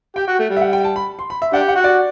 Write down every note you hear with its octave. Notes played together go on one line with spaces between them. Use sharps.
G4 G5
F#4
A3
G3
E5
F#5
G5
A5
B5
C6
B5
E5
D4 G4 F#5
F#5
F#4
D5